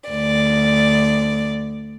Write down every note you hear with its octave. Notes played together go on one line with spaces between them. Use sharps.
D2 D5